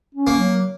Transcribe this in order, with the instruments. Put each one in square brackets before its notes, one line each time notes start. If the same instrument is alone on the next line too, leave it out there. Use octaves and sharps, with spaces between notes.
[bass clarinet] C#4
[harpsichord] A#3
[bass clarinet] F#3